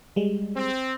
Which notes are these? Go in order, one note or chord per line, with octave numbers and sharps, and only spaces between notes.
G3 G#3
C4